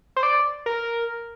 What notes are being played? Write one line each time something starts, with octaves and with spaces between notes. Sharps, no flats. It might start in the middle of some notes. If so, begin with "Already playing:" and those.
C5
D5
A#4